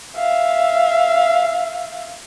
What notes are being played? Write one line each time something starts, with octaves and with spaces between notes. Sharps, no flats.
E5 F5